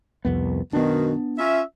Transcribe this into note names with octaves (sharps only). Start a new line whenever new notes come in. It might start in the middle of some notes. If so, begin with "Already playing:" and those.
C2 F2 B3
F#2 B2 D#3 B3 D4
C#4 F4 E5